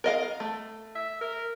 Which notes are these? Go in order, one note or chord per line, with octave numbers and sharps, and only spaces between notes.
A#4 D#5 F5
A3
E5
A#4